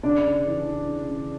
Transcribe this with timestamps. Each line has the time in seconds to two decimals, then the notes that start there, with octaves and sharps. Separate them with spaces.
0.03 C#3 D4 D5
0.25 C#3
0.47 E3
0.67 E3
0.89 C#3
1.09 C#3